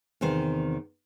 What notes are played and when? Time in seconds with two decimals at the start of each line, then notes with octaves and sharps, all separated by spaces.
0.21 E2 C3 D#3 C5